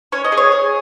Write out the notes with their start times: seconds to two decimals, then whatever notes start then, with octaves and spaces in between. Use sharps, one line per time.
0.12 C#4 C#5
0.24 D#5
0.32 G#4
0.37 C#5
0.52 G#4